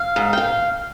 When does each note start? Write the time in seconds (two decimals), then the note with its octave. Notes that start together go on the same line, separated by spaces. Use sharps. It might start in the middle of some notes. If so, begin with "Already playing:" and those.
Already playing: F5
0.16 G#2
0.33 G5
0.38 F5